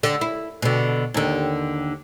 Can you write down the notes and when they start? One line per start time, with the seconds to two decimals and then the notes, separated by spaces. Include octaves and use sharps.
0.03 D3
0.21 E4
0.62 B2 D3
1.14 D#2 D3